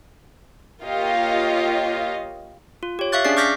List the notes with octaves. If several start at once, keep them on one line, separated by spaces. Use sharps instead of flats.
A#3 F4 G4 C#5 D#5 F5
F4
G4 C#5
E5 F5 C#6 F#6 A6
C#4 D4 G#4 D5 C7
C#6 D6 F6 G6 A#6 B6